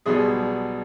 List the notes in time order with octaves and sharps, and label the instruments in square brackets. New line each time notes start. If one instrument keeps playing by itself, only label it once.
[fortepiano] B1 B2 G3 G#4